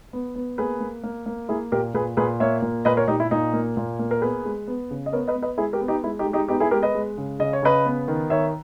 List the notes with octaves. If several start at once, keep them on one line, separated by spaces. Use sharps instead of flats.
B3
B3
A#3 G#4 B4
A#3
A#3
A#3
A#3 E4 G#4
A#2 G4 A#4
A#2 G#4 B4
A#2 G#4 B4
A#3 C#5 E5
A#2
A#2 B4 D#5
A#4 C#5
A#2 D#4 G4
E4
A#2 D#4
A#3
A#2
A#3
A#4
B3 G#4 B4
G#3
B3
C#3
D#5
B3 A#4 C#5
B4 D#5
B3
B4 D#5
G#3 E4 G#4
G4 A#4
B3
D#4 G4
G#3 E4
D#4 G4
G#3
D#4 G4
B3 D#4 G4
E4 G#4
G#3 G4 A#4
B4 D#5
G#3
C#3
C#3 D#5
C#5
C#3 B4 D#5
B3
D#3
D#3 C#5 E5